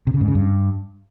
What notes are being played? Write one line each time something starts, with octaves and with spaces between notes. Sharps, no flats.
C3
C#3
G#2
C#3
G2